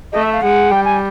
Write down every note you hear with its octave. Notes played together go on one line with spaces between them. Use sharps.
A3 D#5
E5
F5
G#3 F#5
G3 G5
G#5